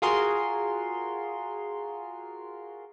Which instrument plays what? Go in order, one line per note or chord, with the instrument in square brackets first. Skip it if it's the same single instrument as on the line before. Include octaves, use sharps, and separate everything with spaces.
[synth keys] F4 F#4 G#4 A#4 C6